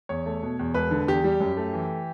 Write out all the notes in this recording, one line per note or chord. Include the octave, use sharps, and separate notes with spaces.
E2 C#5
A3
B2
E2
E1 B4
D3
E2 G4
G3
F#2
A3
E3